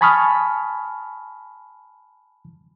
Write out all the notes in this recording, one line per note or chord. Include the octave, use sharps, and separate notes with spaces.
G#5 A5 B5 C#6 D#6 F6